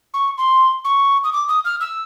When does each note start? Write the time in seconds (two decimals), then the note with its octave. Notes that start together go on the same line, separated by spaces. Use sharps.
0.14 C#6
0.38 C6
0.84 C#6
1.24 D#6
1.33 D6
1.48 D#6
1.65 F6
1.80 E6